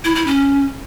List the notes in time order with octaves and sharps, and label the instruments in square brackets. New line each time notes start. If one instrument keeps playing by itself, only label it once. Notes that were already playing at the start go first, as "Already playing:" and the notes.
[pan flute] E4
E4
C#4